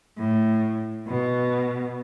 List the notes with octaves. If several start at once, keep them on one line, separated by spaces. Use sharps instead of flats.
A2
B2